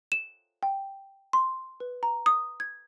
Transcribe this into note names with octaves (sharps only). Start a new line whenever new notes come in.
E7
G5
C6
B4
A#5
D#6
G#6